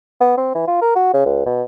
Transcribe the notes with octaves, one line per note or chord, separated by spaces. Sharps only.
B3
C4
E3
F4
A#4
F#4
C#3
C#2
B2